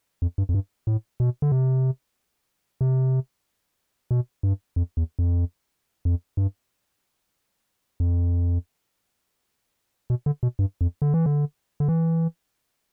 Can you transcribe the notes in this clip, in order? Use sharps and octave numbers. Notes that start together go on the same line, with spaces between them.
F2
G2
F2
G2
A2
B2
D3
C3
C3
B2
G2
F2
E2
F2
F2
G2
F2
B2
D3
B2
G2
F2
D3
E3
D3
D3
E3